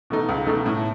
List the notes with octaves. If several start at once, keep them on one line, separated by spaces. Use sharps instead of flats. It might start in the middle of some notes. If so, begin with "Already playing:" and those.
B2 A3 D#4
C#2
B2 A3 D#4
A2